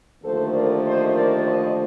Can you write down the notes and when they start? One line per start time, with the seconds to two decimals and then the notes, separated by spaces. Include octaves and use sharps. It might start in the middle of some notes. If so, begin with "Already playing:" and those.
0.22 D#2 D3 F3 A3 A4 C5
0.53 A#4 D5
0.83 C5 D#5
1.14 A#4 D5
1.44 C5 D#5